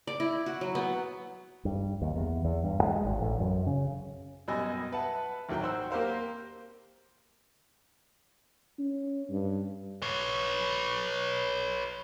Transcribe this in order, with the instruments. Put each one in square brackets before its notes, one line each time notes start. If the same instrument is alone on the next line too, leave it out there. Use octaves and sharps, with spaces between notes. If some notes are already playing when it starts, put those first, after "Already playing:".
[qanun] D5
E4
F#4
F#3
B3
[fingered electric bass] G2
D#2
E2
E2
G2
G#3
G#1
A1
F#2
C#3
[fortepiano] F#2 B2 G3 D#5 G#5 E6
B4 E5 F#5 A5
A1 D#2 F#3 G5
F#4 C5 E6
A#3 G4 A#4 C5 F5
[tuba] C#4
G2
[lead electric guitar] B4 C#5